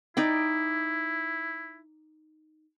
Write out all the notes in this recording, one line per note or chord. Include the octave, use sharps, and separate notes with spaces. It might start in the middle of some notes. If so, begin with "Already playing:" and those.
D#4 E4 D5 G5